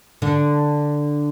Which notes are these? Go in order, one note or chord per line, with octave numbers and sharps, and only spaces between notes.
D3